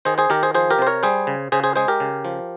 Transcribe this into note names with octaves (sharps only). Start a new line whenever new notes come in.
D#3 G#4 C5
G#4 C5
D#3 G4 A#4
G#4 C5
F3 G#4 C5
G4 A#4
C3 C5
A#4 C#5
G3 G#4 C5
C#3
C#3 G#4 C5
G#4 C5
G#3 G#4 C5
G4 A#4
C#3
F3